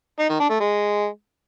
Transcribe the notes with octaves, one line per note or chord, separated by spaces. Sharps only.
D#4
D#3
D4
A3
G#3